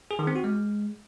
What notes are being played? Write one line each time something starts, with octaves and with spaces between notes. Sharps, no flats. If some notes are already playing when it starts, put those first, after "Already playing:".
G#4
D#3
C4
F#4
G#3